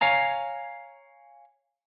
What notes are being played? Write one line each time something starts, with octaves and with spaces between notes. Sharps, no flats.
C#5 F5 G#5 A#5